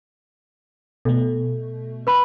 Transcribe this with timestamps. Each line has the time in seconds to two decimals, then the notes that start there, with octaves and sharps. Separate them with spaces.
1.05 B2 A3 A4
2.07 B4 B5